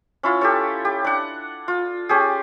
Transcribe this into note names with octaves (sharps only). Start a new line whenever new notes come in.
C#4 E4 F4
G4 A4 C#5
G4
D4 F#5
F4
C#4 G4 G#4